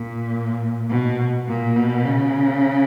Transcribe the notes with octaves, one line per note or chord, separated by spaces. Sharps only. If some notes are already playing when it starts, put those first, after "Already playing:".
Already playing: A#2
B2
A#2
B2
C#3